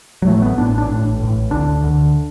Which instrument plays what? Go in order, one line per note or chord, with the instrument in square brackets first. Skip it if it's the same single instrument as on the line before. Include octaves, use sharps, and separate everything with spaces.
[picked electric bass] F#3
A1 A2 A3
B3
A1 A2 D4
D4
A1 A2
A1 A2
D2 D3 D4
D2 D3